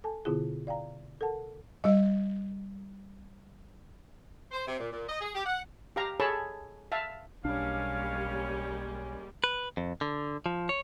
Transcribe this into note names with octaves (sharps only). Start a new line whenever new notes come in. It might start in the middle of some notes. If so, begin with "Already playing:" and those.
A4 G#5 A5
B2 D3 B3 E4 F4 G#4
D5 F5 G5 A#5
A4 A#4 F#5 A5
G3 D#5
C5
C3
A#2
A#2
D#5
G#4
G4
F#5
G4 F5 A#5
G#4 A4 C#5 A5 B5
E5 F5 A5
B1 G3 G#3 A#3 C#4 D4 F5
B4
F2
D3
F3
C#5